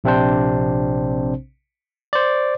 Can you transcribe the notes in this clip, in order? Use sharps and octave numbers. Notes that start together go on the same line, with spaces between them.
A#1 C3 C4 D4 C5
C5 D5